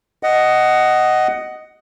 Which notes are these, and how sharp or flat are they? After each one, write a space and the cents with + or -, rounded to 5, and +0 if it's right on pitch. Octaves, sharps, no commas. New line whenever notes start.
D#5 +0 F#5 +15